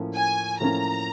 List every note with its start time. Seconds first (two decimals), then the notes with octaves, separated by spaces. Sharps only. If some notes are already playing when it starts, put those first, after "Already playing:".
Already playing: A2 F3 A#3 C#4
0.15 G#5
0.59 A2 F3 A#3 C#4 A#5